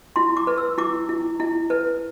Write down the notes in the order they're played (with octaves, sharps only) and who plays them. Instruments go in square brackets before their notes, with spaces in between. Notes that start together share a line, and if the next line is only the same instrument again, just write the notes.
[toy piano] E4 C6
D6
B4
E6
E4 D6
E4
E4
B4